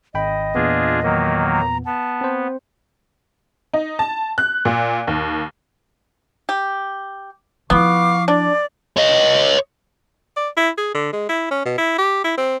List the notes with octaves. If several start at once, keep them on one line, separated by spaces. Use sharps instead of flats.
G#1 D#5 G5 B5
E2 A#2 B3 D4 F4 G#4
D#3 F#3 A#3
A#5
B3 A5
C4 C5
D#4
A5
F#6
A#2
D#2
G4
F3 B3 E4 F5 C#6 D6
D4 D5
C#5 D#5
D5
E4
G#4
D3
G#3
E4
C#4
B2
E4
G4
E4
C4